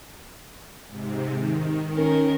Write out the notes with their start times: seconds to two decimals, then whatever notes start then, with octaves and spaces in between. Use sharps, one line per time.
0.88 G#2 C3
1.34 D#3
1.94 C#4 A#4